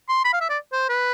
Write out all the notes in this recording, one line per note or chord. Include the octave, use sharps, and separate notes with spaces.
C6
B5
F5
E5
D5
C5
B4